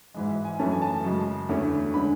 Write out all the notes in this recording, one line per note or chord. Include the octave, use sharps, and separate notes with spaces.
G#2 E3 G#3
E5
G#5
F#2 E3 A3 C#4 A5
G#5
A5
F#2 C#3 G#3
E2 D3 A3 C#4
D3 G#3 C#4 B5